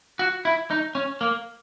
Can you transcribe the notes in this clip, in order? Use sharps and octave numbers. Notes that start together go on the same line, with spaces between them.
F#4
E4
D#4
C#4
A#3